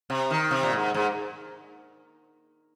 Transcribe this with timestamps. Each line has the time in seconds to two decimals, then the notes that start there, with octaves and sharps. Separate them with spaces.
0.10 C3
0.31 D#3
0.51 C3
0.63 A#2
0.73 G#2
0.94 G#2